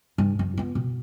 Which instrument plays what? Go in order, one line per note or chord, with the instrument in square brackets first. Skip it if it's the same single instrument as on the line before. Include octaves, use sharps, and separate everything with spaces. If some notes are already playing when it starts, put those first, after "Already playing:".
[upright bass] G2
F#2
B3 F4
B2